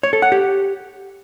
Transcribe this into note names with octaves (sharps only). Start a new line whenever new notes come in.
C#5
A4
F#5
G4